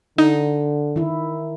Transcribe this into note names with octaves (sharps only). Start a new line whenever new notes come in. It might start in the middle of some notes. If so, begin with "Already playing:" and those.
D3 D#4
D#3 E4